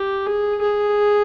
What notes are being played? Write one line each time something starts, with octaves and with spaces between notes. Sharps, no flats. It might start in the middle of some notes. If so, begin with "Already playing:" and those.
Already playing: G4
G#4
G#4